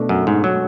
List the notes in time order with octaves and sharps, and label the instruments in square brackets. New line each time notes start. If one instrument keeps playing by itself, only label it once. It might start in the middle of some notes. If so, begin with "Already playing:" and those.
Already playing: [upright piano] B2 A3 D4
[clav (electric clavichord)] F#2
G#2
F#3